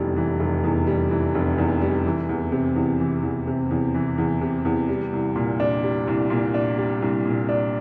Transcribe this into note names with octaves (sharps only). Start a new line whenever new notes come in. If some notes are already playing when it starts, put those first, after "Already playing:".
Already playing: F1 E2 E3 G3
E3
F1
E2
G3
E3
F1
E2
G3
E3
E2
C3
E2
E3
E2
C3
E2
E3
E2
C3
E2
G3
C2
A#2
D4
G3
C2
A#2
D4
G3
C2
A#2
D4